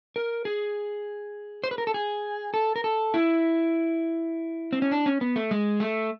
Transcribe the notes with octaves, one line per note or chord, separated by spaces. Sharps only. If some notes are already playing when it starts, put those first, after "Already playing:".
A#4
G#4
C5
B4
A#4
A4
G#4
A4
A#4
A4
E4
C4
C#4
D4
C#4
B3
A3
G#3
A3